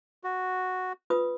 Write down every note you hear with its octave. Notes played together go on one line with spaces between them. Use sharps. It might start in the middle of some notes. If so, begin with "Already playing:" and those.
F#4
F4 B4 D#6